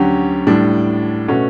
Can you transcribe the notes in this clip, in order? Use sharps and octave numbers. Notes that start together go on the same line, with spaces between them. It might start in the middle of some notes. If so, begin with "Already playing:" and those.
Already playing: D2 D3 F#3 C#4 G4
A2 G3 D4
B2 A3 C#4 F#4